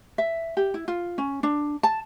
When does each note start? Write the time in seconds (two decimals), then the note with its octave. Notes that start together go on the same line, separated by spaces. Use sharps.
0.18 E5
0.57 G4
0.74 E4
0.88 F4
1.18 C#4
1.43 D4
1.83 A5